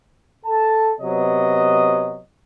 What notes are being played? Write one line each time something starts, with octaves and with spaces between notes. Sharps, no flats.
A4 A5
C3 F#3 B3 C#5 D#5